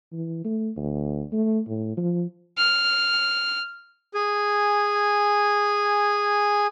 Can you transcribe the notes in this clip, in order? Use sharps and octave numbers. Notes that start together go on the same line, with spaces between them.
E3
A3
D2
A3
A2
F3
F6
G#4 G#5